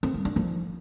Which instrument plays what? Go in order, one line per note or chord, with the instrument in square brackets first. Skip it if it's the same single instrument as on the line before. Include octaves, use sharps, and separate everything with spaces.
[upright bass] C4
G3
D4
F3